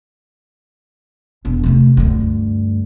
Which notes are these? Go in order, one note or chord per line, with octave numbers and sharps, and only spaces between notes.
E1 D4
C3 A3
D2 G2